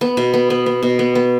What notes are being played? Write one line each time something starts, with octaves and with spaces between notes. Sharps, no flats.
B3
B2
B3
B3
B3
B2
B3
B3